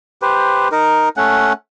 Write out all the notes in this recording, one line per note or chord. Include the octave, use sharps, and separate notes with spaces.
G4 B4 C5
D#4 A#4
A3 C#4 F#5